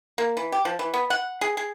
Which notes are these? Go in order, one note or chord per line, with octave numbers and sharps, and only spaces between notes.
A#3
E3
G4
F3
E3
B3
F#5
G#4
G#4